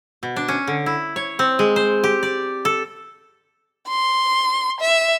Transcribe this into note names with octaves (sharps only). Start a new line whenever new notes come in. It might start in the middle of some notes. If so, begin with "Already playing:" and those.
B2
D4
C#4
D3
E4
C#5
C4
G#3
C5
G4
D5
A4
C6
E5